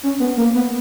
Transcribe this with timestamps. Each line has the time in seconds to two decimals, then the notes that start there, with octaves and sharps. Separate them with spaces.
0.03 C#4
0.20 B3
0.37 A#3
0.55 B3